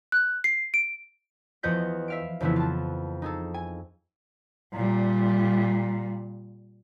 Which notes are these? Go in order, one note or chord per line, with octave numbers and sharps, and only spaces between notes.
F#6
C7
D7
E2 F3 F#4 D#5 G6 B6
E5 F5 D7
F2 C#3 E3 F3 B3 E4
F4 A5
D#4 G#4 A4
G#5
A#2 G3